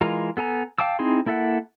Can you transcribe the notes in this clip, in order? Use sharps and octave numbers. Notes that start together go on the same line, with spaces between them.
E3 G#3 F4 A#4 A#5
B3 A4 G#5 A#5
F5 G5 A5 D6 E6
C4 D#4 E4 G#4 C6
A#3 E4 A4 E5 F#5